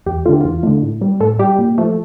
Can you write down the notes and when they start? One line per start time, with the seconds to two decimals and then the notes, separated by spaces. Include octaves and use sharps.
0.06 E2 G4
0.25 A3 F4
0.28 D3 G4
0.41 E2 F4
0.63 D3 A3
0.83 A2
1.01 G3
1.20 A2 A4
1.39 G3 G4
1.59 A#2
1.78 F3 A3